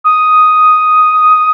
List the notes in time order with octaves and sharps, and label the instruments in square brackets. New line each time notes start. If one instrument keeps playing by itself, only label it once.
[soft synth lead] D#6